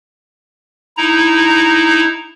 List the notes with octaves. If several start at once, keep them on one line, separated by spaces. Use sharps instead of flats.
D#4 E4 A#5